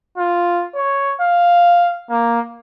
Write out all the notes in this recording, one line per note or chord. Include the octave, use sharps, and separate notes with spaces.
F4
C#5
F5
A#3